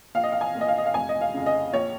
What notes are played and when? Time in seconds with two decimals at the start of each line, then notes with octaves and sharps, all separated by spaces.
0.15 A#1 F5
0.23 D#5
0.32 F5
0.41 G#5
0.55 A#2
0.61 D#5
0.68 F5
0.78 D#5
0.86 F5
0.94 F1 G#5
1.09 D#5
1.21 F5
1.34 F2 C#3
1.46 D#5
1.73 A#1 C#5